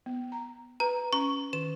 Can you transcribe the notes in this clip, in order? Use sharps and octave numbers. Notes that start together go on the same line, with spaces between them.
B3
A#5
B4 A#5
C#4 A#5 C#6
D#3 E7